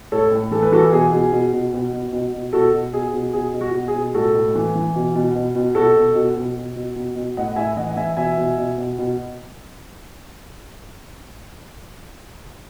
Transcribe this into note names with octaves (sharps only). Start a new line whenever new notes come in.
A2 A4 C#5
A2
E3 A4
B4
E3 F#4 A4
B2 G#4
B2
B2
B2
B2
B2
B2
B2
B2 F#4 A4
B2
B2 G#4
B2
B2 G#4
B2
F#4
B2
G#4
B2
A2 F#4 A4
A2
E3
E3
B2
B2
B2
B2
B2 F#4 A4
B2
B2
B2
B2
B2
B2
B2
A2 D#5 F#5
A2 E5 G#5
E3 D#5 F#5
E3 E5 G#5
B2 E5 G#5
B2
B2
B2
B2